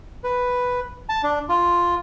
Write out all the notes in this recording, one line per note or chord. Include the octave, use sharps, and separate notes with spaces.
B4
A5
D4
F4